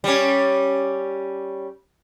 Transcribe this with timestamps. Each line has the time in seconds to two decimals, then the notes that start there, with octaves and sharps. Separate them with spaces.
0.04 G3 C#4